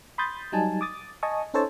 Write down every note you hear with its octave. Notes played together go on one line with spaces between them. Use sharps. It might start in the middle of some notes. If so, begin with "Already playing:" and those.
B5 C6 D#6 G6 A6
F#3 G3 D#4 G#5 A5
D6 D#6 A6
D#5 G#5 A5 C#6 D#6
C#4 D#4 A4 C5 C#5 A5